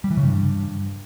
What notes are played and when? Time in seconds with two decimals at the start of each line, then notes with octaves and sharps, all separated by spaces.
0.04 G3
0.11 E3
0.17 C#3
0.24 G2